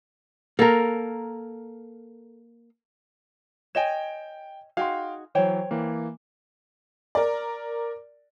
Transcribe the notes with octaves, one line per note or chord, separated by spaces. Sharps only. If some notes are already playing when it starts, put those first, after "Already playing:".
A#3 A4 A#4
C#5 D#5 G5 G#5 E7
D#4 F#4 G#4 F5 G5 C6
E3 F#3 C5 C#5 G5
E3 A#3
A#4 D5